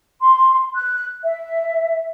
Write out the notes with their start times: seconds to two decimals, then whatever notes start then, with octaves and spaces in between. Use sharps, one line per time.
0.22 C6
0.75 F#6
1.23 E5